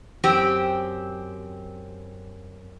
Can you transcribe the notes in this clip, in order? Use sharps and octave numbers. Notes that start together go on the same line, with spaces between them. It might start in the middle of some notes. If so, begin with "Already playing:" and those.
F#2 C4 G4